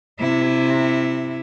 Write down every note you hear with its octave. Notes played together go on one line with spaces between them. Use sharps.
C3 E4